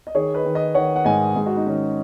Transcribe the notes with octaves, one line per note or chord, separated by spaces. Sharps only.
D#5
D#3 G#4 C#5
B4 D#5
D#3
B4 D#5
D#3 C#5 F#5
F#5
G#2 D#5 G#5
G#2 G#4
F#4
D#4
D#3 C#4 F#4